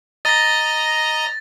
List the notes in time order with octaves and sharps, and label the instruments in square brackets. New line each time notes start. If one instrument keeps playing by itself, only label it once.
[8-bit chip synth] D#5 A#5 [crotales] A6 A#6